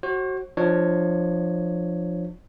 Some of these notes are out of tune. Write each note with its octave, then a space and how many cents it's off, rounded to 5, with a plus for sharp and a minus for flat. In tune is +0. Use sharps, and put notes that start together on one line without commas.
F#4 +20 C5 +45
F3 +0 D4 +35 C#5 +0